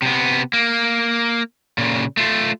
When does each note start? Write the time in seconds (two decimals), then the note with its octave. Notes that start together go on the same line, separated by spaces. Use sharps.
0.02 C3 B3
0.53 A#3
1.78 A#2 C#3
2.17 A3 F4